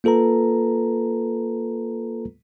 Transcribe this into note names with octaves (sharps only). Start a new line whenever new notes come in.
A#3 F4 A4 B4 A#5